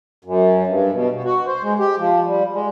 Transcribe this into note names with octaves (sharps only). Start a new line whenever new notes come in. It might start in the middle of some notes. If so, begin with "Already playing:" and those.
F#2
G2
B2
B2
F#4
C5
G#3
G4
F3
G3
G#3